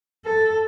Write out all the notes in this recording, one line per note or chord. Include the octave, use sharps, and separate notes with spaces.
A4